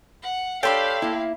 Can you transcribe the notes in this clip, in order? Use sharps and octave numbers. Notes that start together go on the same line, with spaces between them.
F#5
D4 G4 A4 C#5 F5 G5 B5 C6
A#3 E4